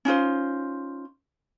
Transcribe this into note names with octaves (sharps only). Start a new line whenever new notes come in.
C#4 D#4 F4 C5